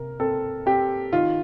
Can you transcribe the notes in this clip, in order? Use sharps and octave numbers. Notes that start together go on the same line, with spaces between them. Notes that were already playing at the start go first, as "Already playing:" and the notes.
Already playing: C3 A#4
C4 A4
C4 G4
D#3 F4